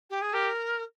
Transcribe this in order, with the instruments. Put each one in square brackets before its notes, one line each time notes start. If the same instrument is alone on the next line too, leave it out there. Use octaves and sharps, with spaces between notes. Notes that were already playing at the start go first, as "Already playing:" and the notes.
[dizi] G4
G#4
[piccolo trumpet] G4 [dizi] A#4